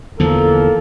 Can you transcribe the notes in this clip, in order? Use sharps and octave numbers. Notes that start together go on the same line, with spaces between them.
E2 D3 F3 A#3 A4